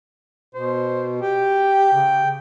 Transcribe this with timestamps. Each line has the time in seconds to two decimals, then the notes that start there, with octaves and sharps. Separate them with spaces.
0.55 B2 C5
1.21 G4 G5
1.93 C#3